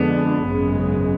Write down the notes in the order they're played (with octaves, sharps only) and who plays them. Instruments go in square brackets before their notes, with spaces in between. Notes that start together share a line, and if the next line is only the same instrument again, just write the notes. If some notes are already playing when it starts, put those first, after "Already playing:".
Already playing: [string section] F2 D3 G#3 D4 [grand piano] B3
[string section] G#1 F#2 C#3 G#3